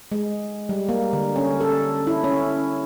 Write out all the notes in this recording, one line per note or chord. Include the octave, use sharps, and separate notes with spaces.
G#3
G3
A#3
D3
C#4
A4
E4
C#4